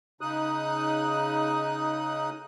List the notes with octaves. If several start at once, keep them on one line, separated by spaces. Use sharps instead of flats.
C#3 D#4 D#6 F#6